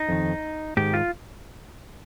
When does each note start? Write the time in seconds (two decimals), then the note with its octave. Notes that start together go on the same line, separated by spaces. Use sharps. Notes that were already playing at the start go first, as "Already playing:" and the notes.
Already playing: D#4
0.09 F2 D#3
0.77 G#2 D#3 G4
0.94 F4